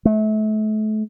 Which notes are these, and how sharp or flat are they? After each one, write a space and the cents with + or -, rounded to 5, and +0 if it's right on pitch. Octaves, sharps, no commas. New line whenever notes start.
A3 -35